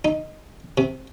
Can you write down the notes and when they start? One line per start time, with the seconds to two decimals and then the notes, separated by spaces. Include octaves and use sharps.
0.05 D#4
0.78 C3